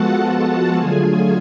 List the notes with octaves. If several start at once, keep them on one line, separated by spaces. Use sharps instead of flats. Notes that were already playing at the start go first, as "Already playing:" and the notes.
Already playing: F3 G#3 B3 F4 F#4 A4 F#5 A5
D3 F#3 A3 F4 G#4 G#5